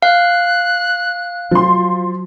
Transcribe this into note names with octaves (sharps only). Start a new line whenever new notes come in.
F5 F#6
F3 F#3 C6